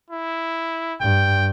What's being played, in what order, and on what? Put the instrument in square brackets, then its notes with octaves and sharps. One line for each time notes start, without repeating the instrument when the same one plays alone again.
[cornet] E4
[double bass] G2 [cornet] G5